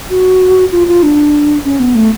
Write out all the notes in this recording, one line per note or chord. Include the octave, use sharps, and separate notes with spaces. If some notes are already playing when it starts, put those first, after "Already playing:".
F#4
F4
F4
D4
C#4
B3
A3